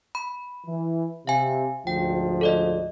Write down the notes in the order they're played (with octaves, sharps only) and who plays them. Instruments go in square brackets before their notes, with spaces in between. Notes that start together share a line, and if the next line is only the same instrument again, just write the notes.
[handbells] B5
[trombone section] E3
[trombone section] C3 [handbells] F5 G#5
[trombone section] D2 G#2 F3 [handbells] G5
[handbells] A4 D5 D#5